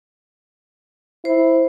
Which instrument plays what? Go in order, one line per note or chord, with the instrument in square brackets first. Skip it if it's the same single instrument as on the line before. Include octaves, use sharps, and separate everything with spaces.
[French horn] E4 [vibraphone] C5